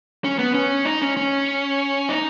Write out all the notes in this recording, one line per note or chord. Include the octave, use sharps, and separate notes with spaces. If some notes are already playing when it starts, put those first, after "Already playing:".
C#4
B3
C#4
D#4
C#4
C#4
D#4